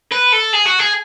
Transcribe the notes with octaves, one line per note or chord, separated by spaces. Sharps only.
B4
A4
G#4
F#4
G#4